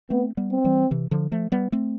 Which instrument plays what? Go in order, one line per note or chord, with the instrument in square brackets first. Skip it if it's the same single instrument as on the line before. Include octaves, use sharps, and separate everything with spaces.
[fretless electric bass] A3 C4 [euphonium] B3
[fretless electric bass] G3 B3
[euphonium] C4
[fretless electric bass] E3 G3
C3 E3
D3 F3
F3 A3
G3 B3
A3 C4